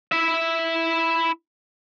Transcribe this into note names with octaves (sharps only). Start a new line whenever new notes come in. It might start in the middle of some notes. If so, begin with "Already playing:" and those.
E4 E5